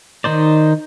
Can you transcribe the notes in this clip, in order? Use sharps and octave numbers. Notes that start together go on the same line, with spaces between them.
D#3 D#4 C5 D5